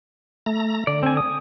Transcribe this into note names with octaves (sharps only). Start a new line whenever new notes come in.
A3 A#5
D3 D5
C4 G#5
D#6